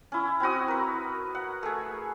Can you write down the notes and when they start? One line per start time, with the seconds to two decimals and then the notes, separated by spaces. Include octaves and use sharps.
0.12 C#4 E4
0.40 C4 E4 F#4 D#6
0.68 A#4 B4
1.35 F#5
1.63 A3 G#4